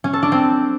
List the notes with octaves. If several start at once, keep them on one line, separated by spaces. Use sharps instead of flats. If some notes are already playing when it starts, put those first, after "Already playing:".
C#4
A4
D4
C4